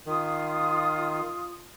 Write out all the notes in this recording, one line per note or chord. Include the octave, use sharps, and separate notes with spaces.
D#3 F4 D#6